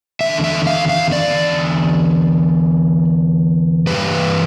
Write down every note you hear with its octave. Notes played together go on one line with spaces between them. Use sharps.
E2 D3 E5
E5
F5
F5
D5
G2 E3 B4